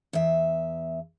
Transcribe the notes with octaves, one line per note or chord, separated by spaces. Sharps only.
E2 E5